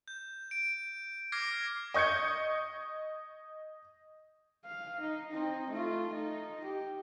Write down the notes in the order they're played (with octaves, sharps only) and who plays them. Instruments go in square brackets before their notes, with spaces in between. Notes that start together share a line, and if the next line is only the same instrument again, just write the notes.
[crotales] G6
D7
D6 F6 G#6 A#6 C7
[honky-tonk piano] D#5 C#6 G6 G#6 C#7
[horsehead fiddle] F5
D#4
C4 D#4
A3 F4
D#4
G4